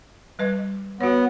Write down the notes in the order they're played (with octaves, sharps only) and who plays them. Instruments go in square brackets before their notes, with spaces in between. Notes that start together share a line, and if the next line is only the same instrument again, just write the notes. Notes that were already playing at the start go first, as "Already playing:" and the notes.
[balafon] G3 B4 D#5
[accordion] B3 [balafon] F#4 C#5